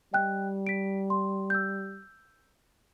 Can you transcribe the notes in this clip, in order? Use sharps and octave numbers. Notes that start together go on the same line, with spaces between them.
G3 D#5 G5 F#6
B6 D7
C6
E6 G6